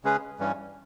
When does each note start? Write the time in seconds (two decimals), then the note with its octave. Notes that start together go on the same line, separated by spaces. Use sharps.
0.04 C#3 G#3 C#4 G#4 B4
0.39 G2 E3 G3 C#4